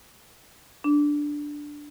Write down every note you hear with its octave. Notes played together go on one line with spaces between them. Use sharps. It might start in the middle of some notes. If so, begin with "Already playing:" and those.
D4